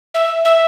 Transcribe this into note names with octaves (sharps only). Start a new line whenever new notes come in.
E5
E5